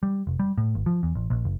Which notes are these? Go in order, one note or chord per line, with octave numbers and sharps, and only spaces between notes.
G3
F1
G3
A2
G#1
F3
E2
A1
A#1
F#1